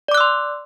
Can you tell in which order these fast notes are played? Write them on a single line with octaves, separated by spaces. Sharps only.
D5 D6 F#6 E6 C6